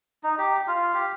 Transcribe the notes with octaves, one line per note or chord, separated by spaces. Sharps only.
D#4
G4
F4
G4